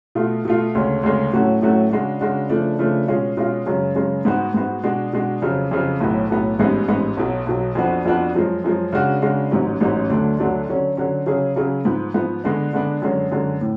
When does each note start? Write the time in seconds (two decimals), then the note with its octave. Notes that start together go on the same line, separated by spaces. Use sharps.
0.15 B2 A3 F4
0.45 B2 A3 F4
0.75 D2 C#3 G#3 C#4
1.03 D2 C#3 G#3 C#4
1.33 A2 F#3 A3 C#4 F#4
1.62 A2 F#3 A3 C#4 F#4
1.91 C#3 G#3 D4 F#4
2.21 C#3 G#3 D4 F#4
2.50 C#3 F3 A3 D4
2.79 C#3 F3 A3 D4
3.08 B2 G#3 C#4 F4
3.37 B2 G#3 C#4 F4
3.67 F#2 C#3 G#3 C#4
3.95 F#2 C#3 G#3 C#4
4.25 G#2 G#3 B3 F#4
4.54 G#2 G#3 B3 F#4
4.84 B2 G#3 D4 F#4
5.13 B2 G#3 D4 F#4
5.42 F2 C#3 F#3
5.71 F2 C#3 F#3
6.01 B1 A2 F#3 B3
6.30 B1 A2 F#3 B3
6.59 A1 G#2 G#3 B3
6.88 A1 G#2 G#3 B3
7.17 B1 B2 F#3
7.47 B1 B2 F#3
7.75 F2 F3 B3 D4 F#4
8.05 F2 F3 B3 D4 F#4
8.35 F#2 F3 G#3
8.64 F#2 F3 G#3
8.93 C#3 G#3 D4 F#4
9.22 C#3 G#3 D4 F#4
9.51 A1 G#2 F#3 C#4
9.80 A1 G#2 F#3 C#4
10.09 D2 D3 F#3 A3 D4
10.39 D2 D3 F#3 A3 D4
10.68 D3 F#3 C#4
10.97 D3 F#3 C#4
11.26 C#3 F#3 C#4 G#4
11.56 C#3 F#3 C#4 G#4
11.85 G#2 F3 B3
12.14 G#2 F3 B3
12.44 D3 G#3 B3 D4
12.73 D3 G#3 B3 D4
13.02 F#2 D3 G#3 C#4
13.32 F#2 D3 G#3 C#4
13.61 A2